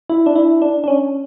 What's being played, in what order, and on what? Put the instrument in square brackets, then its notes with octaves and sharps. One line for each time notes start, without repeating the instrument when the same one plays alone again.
[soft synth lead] E4
D4
E4
D4
D4
C#4